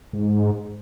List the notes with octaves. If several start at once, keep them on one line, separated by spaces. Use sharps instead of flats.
G#2